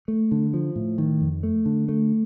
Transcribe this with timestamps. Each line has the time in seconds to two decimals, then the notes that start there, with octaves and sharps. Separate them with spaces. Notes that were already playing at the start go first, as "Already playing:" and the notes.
0.08 A3
0.31 D3
0.54 F3
0.76 A2
0.98 D#3
1.21 F2
1.43 A3
1.66 D3
1.89 A3